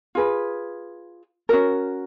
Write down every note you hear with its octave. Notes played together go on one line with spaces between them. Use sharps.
F4 G#4 B4
C#4 F#4 A#4